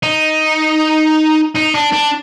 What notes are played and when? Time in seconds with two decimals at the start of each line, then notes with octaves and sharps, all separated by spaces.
0.03 D#4
1.55 D#4
1.75 D4
1.93 D4